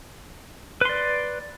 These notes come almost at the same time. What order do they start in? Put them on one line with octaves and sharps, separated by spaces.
B4 C6 D5